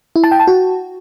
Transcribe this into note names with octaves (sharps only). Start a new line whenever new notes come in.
E4
A5
G5
A5
F#4